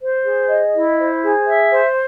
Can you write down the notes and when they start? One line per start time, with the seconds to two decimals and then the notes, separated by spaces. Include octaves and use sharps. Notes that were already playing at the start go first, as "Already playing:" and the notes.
0.01 C5
0.25 G#4
0.49 D#5
0.74 E4
0.99 C5
1.23 G#4
1.47 E5
1.72 C5